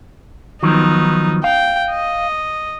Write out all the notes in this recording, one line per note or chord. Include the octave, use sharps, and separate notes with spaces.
D#3 F3 F#3 B3 D#4
F5 G5
D#5